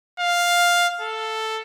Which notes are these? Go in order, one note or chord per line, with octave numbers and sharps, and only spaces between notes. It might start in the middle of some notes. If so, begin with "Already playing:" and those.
F5
A4